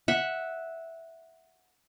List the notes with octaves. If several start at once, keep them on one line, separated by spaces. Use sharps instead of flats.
E5 F#5